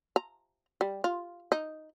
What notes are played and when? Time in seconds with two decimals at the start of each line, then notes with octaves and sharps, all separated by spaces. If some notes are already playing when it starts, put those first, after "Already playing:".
0.16 A#5
0.81 G3
1.04 F4
1.52 D#4